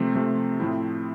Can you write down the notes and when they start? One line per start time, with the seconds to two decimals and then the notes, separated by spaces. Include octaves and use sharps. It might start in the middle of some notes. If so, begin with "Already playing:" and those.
Already playing: C3 F3 A3 C4
0.15 C3 F3 A3 C4
0.60 A2 F3 C4 E4